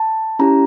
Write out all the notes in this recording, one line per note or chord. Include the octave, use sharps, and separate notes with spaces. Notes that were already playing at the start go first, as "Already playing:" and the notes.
Already playing: A5
C#4 E4 G4 A#5